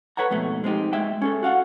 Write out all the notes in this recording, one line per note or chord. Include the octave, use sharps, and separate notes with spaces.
A4 B4 C#5 F#5 A#5
F2 G#2 B2 A3
G#3 C4 D#4 G4
G#3 E5 G5
C#4 G#4 A4
F#4 F5 F#5